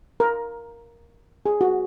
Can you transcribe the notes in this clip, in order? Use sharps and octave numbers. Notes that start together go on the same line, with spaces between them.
A#4
G#4
F#4